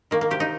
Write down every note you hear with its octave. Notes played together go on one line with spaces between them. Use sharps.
D#3 A#3
A#3
C3 G4
D#4